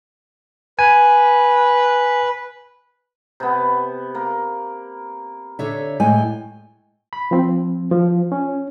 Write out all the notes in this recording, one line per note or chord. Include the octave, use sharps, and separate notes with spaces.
B4 G#5
C3 B3
A#3
D3 C#5 E5
A2 G#3 G5 G#5
B5
F3 C4
F3
C#4